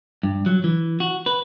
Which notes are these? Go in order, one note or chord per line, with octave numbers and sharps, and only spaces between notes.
G2
F#3
E3
F#4
B4